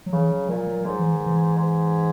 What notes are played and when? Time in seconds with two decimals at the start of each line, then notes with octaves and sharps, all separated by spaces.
0.06 F#3
0.13 C#3 E3
0.31 F#3
0.49 A#2 F#3
0.67 F#3
0.85 G#2 F#3
0.99 E3
1.13 D#3
1.26 E3
1.58 G#2